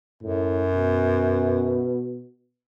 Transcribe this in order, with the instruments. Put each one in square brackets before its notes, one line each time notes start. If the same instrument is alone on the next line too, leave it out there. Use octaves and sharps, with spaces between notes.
[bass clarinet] F#2 [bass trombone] A2
[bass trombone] B2